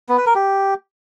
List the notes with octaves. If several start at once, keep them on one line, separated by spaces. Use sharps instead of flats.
B3
B4
A#4
G4